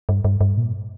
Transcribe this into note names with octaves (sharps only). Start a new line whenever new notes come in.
G2
G2
G2
A#2